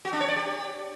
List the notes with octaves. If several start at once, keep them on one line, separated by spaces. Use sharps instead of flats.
F#4
D4
C#5
D5
G4